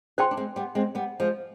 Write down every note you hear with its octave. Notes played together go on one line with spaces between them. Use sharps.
F4 G#4 C5 G5 C6
D4
G#3 C4
G3 B3
G#3 C4
G3 B3
F3 G#3